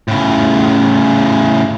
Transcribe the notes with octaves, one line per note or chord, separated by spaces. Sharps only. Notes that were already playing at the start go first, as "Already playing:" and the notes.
A2 C#3